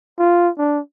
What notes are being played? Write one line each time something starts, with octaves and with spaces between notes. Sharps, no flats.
F4
D4